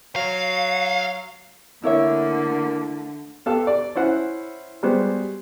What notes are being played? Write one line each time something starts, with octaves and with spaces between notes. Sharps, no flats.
F#3 F5
D3 A3 A#3 E4 C#5 E5
B3 G4 A4 F5 A5
D5
C#4 E4 C5 F#5
G3 G#3 B3 F#4 C5